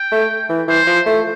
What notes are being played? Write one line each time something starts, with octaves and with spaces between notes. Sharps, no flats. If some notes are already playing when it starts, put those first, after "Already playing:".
Already playing: G5
A3
E3
E3 C5
F3
A3